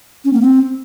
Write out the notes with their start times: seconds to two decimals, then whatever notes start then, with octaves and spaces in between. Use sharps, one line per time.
0.25 C#4
0.33 A#3
0.42 C4